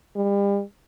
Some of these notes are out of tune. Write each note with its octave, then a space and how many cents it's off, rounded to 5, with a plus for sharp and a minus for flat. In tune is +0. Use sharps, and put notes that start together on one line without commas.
G3 +35